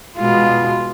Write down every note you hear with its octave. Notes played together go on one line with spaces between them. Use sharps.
B2 G#3 F4